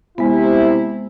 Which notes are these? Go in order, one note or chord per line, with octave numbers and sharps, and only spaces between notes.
C3 G#3 B3 E4